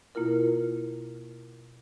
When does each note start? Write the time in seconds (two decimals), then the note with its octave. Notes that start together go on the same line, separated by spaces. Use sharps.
0.15 B2 A#3 E4 F4 A#4